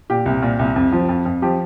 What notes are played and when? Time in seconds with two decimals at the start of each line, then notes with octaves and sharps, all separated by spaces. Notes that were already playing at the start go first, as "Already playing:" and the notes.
0.10 A#2 G4
0.26 C2
0.42 A#2
0.59 C2
0.76 F2
0.92 F3
1.09 F2
1.25 F2
1.42 F3 G4